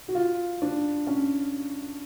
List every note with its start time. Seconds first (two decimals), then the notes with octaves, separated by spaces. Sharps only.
0.08 F#4
0.15 F4
0.62 D4
1.07 C#4